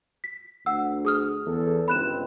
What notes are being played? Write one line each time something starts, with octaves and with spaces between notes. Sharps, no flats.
B6
D2 F#5 E6
G#4 D#6 F6
E2 A4
G1 C#2 C4 B5 F#6 E7